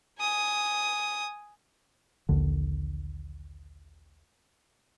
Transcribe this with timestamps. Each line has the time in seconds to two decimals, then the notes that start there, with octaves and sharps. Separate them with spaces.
0.19 G#5 D#6
2.29 A#1 D#2 D3